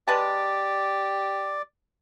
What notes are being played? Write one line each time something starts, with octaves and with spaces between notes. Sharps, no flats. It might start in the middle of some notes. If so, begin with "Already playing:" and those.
G#3 G4 B4 D5 A5